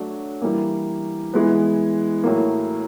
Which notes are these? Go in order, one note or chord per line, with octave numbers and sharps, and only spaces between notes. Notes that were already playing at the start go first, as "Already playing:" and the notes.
Already playing: F#3 A3 D4 F#4
E3 G3 A#3
E3 G#3 B3
A2 F#3 A#3